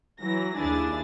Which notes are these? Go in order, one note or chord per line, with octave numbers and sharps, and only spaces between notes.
E3 F#3 A#6
D#2 D4 E4 G#4 A6